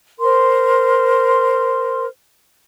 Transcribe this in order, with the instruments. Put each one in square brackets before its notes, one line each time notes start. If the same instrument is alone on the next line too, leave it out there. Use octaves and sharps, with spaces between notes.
[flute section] A#4 C5 C6